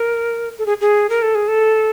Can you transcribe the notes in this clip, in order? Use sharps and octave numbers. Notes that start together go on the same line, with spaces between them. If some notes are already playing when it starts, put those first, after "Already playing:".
Already playing: A#4
A4
G#4
G#4
A#4
A4
G#4
A4